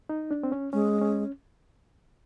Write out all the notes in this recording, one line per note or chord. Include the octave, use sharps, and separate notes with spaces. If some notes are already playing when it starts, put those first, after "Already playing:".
D#4
D4
C4
C#4
G#3 C#4
C#4